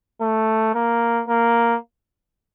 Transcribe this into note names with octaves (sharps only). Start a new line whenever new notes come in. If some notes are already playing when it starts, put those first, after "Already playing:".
A3
A#3
A#3